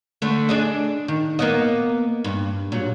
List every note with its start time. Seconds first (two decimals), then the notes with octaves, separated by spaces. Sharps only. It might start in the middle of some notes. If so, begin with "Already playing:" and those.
0.22 D3 A3
0.49 D4 G#4 D#5
1.08 D#3
1.39 A#3 B3 D#5
2.24 G2
2.72 A#2 F#3